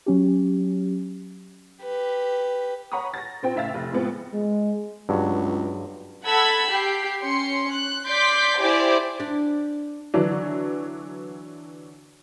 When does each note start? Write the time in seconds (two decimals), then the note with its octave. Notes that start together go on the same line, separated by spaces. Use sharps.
0.06 F#3 C#4 G4
1.82 G4 B4
2.92 C#5 F#5 A#5 B5 C#6 D#6
3.14 A6 A#6
3.42 A#2 C4 G5
3.55 A2 C#3 E5 F5 A6
3.74 F1
3.92 A2 F3 G#3 B3 C4
4.34 G#3
5.09 C#2 G2 F#3
6.26 A4 F#5 B5 E6 G#6
6.70 G4 G5 C7
7.23 C#4 C6 C#7
7.73 F#6
8.07 D5 C6 D6 G6 B6
8.60 E4 G4 C5 D5 G#5 D6
9.20 D4
10.14 D3 E3 F#3 D4